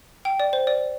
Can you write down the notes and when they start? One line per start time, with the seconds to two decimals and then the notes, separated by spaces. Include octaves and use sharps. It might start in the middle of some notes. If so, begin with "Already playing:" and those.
0.25 G5
0.40 D5
0.53 C5
0.67 D5